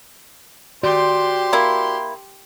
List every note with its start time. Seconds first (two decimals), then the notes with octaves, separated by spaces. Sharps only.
0.83 F#4 G4 C5 D5 C6
1.53 A#3 E4